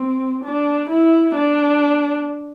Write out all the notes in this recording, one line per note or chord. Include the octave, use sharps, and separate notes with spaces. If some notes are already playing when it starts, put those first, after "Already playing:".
Already playing: C4
D4
E4
D4